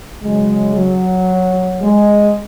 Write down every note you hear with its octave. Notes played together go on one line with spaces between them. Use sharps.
C#3 F#3 G#3
F#3
G#3